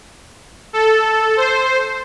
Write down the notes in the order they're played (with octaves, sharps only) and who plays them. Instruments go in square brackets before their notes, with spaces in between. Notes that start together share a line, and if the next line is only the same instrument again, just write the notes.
[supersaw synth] A4
C5